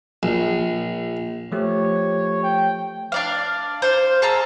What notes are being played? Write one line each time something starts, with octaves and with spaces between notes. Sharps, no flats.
A#1
F3 A3 G4 C#5
G5
D4 D5 F5
C5 F5
G#4 A5 A#5 E6